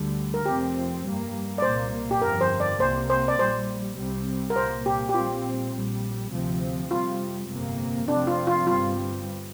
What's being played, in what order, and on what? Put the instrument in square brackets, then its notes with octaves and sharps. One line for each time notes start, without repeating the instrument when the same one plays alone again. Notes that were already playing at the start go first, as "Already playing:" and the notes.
Already playing: [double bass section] D2 D3 G3
[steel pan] A#4
[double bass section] F1 F2 F3 C4 [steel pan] G4
[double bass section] G2 G3 A#3
[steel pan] D5
[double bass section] C2 A#2 A#3 [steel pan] C5
[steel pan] G4
[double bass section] G1 F2 F3 [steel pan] A#4
[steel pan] C5
D5
[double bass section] C2 C3 A#3 [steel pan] C5
[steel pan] C5
D5
[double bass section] A#1 A#2 G3 [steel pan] C5
[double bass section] C2 C3 G3 C4
[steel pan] A#4
[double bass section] C2 A#2 A#3 [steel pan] C5
[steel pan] G4
G4
[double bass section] A#1 A#2 G3 C4 [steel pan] F4
[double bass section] A#1 A#2 G3
D2 C3 F3 C4
[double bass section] F2 C3 G3 [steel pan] F4
[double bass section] G1 F2 C3 A#3
[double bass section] F1 F2 C3 F3 C4 [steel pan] D4
[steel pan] F4
F4
[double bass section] G1 G2 G3 C4 [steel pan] F4